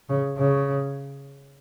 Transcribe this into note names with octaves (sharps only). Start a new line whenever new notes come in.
C#3
C#3